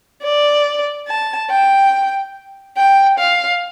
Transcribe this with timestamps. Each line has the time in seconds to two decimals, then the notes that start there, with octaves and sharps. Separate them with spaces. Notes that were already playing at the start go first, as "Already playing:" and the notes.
0.23 D5
1.08 A5
1.51 G5
2.77 G5
3.19 F5